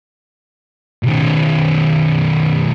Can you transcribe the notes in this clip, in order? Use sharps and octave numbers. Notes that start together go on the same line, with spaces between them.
B1 D#3